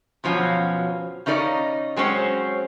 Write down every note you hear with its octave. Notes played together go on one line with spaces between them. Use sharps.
F2 B2 F3 F#3 C#4
C#3 C#4 D#4 A#4 D5 D#5
F#3 G#3 C4 C#4 C5